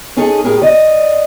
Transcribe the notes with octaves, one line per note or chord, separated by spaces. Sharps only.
C#4 D#4 G#4 A4
A2 C#4 G4 G#4 A#4
D5 D#5